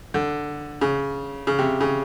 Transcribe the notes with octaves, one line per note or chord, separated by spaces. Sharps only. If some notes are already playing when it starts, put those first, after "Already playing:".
D3
C#3
C#3
C3
C#3